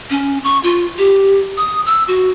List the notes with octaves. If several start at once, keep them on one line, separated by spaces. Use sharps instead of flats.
C#4
C#6
F4
G4
D#6
E6
F#4